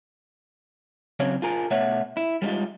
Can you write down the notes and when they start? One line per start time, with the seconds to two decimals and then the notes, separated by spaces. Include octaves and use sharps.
1.20 C#3 F#3 C4 C#5 F5
1.42 F4 G#4 A#4
1.71 B2 A3 C#5 E5 F#5
2.17 E4
2.42 G3 G#3 D4 D#4 F4